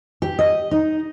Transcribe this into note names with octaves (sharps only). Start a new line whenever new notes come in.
G4
D#5
D#4